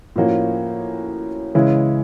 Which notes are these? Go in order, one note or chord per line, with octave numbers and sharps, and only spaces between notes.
A2 F3 A#3 C#4 F#4
C#3 E3 G#3 C#4 E4